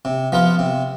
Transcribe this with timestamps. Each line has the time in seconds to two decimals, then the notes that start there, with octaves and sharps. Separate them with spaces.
0.05 C3
0.32 F3 B3 F4
0.59 C3